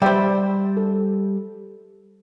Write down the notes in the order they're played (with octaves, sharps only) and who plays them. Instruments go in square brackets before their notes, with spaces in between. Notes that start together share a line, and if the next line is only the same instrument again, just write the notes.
[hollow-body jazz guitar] G3 C5 [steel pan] D5 E5 G5
[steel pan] A4